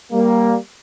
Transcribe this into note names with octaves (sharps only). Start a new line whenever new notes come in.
G3 A#3